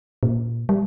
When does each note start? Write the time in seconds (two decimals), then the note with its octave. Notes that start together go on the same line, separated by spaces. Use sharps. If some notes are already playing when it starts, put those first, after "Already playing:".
0.23 A#2
0.69 G3